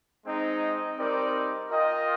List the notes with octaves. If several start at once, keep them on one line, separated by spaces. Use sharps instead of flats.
G#3 C4 D#4
G3 C4 D#4 A#4 D5
F4 A#4 D#5 G5